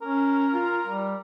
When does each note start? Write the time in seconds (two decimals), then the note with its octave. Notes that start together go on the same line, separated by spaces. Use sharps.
0.02 C#4 A#4
0.54 F4
0.87 G3